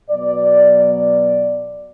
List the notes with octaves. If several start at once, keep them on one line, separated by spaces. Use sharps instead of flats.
B2 F#3 B3 D5
D5